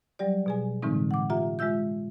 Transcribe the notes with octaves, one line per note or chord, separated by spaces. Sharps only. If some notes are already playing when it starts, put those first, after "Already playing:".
F#3 G3 G4 D5
B2 G#4 G#5
A2 D3 E3 G#3 C4 D#4
F#5 D6
F4 G4 E5 A#5
G#3 F4 E5 E6 G6